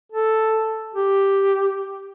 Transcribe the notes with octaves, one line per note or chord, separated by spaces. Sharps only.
A4
G4